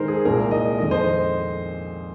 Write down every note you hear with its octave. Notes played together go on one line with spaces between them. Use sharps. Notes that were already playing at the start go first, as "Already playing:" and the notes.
Already playing: G#2 D#3 G#3 A#4 C5
G#4
C2 A#2 G#3 A#4
D#5
F2 D#3 G#3 D#5
C5